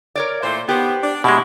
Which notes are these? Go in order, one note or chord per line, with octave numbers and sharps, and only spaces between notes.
A#4 C#5 D5
A#2 E3 A3 C5
D#3 B3 G4 C5
D4
B2 G#3 E4 G4